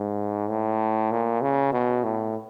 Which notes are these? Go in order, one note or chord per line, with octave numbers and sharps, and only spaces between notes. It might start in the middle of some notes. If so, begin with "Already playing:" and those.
Already playing: G#2
A2
A#2
C#3
B2
A2